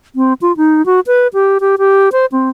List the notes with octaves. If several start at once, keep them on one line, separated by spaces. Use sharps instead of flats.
C4
F4
D#4
F#4
B4
G4
G4
G4
C5
C4